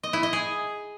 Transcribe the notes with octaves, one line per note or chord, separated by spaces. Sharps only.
D#5
E4
D#5
G#4